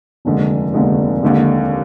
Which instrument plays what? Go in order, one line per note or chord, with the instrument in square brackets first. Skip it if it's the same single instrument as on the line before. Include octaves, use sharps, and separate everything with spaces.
[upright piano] F1 D#2 D3 G#3
F1 D#2 D3 G#3
D#2 D3 G#3